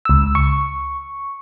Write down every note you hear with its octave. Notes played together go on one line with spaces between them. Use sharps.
C#2 E6
C#6